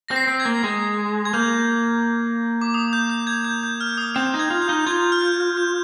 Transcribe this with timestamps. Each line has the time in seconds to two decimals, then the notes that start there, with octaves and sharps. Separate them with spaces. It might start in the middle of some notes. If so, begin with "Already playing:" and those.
0.08 C4 A#6
0.16 C7
0.27 C4
0.40 G#6
0.45 A#3
0.64 G#3
1.25 G#6
1.34 A#3 G6
2.61 D6
2.74 D#6
2.93 G6
3.10 G6
3.27 G#6
3.45 G6
3.63 G6
3.81 F6
3.97 D#6
4.16 C4 G6
4.34 D#4
4.39 G#6
4.50 F4
4.62 G6
4.69 D#4
4.79 G6
4.86 F4 G#6
5.12 F6
5.21 G6
5.57 G6